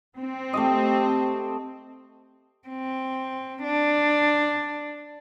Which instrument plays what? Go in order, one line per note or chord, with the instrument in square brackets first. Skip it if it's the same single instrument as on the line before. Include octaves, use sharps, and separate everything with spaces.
[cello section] C4
[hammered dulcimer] A3 G4 D#5
[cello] C4
D4